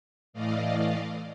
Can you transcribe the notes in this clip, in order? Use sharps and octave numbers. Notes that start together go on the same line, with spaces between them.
A2 E3 A3 D5 D#5 F5